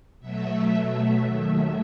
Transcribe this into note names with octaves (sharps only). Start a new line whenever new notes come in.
B2 F#3 A3 E5
E5
D#2 D#3 F#3 A3